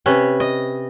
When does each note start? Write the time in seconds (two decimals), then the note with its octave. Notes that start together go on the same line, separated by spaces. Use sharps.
0.06 C3 C#4 B4
0.40 D#5